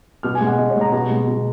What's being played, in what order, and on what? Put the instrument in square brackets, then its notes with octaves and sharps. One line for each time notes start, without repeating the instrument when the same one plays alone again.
[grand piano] B2 F6
G#5
G#3
F#5
B2 D#5
C#5
G#3 A#5
B2 A#5
G#3
B2